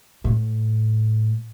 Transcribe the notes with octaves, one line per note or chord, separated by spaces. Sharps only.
A2